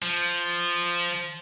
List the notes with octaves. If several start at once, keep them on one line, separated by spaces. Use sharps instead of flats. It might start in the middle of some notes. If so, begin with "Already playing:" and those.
F3